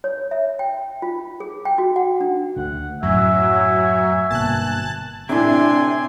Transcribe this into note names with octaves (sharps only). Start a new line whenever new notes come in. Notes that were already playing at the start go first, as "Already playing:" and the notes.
C#5
E5
G5
F4
G#4
G5
F#4
F#5
D4
D2 A3 F#5
F#2 A2 F#3 E5 G#5
G1 B2 A#3 A5 F#6
A2 C3 D4 G#5 C6